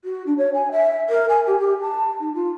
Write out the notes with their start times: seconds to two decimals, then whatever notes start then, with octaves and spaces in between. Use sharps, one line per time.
0.04 F#4
0.26 D4
0.38 C#5
0.54 G#5
0.72 E5
1.10 A#4
1.29 G#5
1.47 G4
1.59 G4
1.81 A5
2.20 D#4
2.35 F4